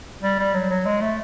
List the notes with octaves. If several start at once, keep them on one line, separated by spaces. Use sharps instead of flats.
G3
G3
F#3
F#3
G#3
A3